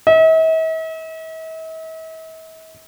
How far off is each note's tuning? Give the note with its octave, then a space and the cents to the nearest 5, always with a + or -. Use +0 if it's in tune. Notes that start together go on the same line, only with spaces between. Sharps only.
E5 -45